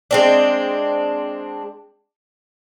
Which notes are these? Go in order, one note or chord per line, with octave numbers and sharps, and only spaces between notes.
G#3 C4 D4